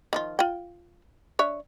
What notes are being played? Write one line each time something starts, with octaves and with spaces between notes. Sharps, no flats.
D#3 F3 F4
F4 G5
D4 C#5 E5